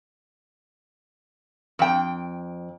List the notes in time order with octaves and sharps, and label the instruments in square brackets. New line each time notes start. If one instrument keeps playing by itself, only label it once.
[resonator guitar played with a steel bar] F2 G5